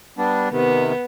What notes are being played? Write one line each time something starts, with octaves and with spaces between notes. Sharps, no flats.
G3 B3 D4
C3 D#3 B3